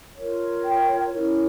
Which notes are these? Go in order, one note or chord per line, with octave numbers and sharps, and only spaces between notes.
F4 A#4 C#5
G5
C#4 E4 A#4 C#5